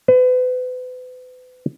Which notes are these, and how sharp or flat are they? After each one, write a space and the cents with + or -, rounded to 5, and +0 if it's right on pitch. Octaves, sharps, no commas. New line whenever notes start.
B4 +35